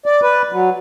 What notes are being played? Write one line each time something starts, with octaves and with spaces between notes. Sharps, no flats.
D5
B4
F#3